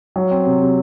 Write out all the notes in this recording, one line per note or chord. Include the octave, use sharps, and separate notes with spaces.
F#3
C4
C3
C3